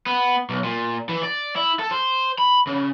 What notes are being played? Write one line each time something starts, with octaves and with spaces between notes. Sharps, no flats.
B3
B1
A#2
E3
D5
E4
A4
C5
B5
C#3